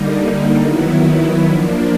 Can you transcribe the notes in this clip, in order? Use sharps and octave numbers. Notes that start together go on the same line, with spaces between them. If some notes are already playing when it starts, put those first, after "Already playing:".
Already playing: D3 G3 A#3 D#4
D#3 F#3 B3 E4
F3 A#3 D4